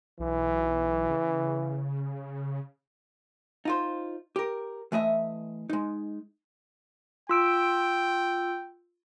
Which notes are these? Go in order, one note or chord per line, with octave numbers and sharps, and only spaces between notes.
B1 E3
C#3
D#4 F4 C5
G4 A#4
E3 A3 D#5 E5
G#3 D#4
F4 G5 E6 D7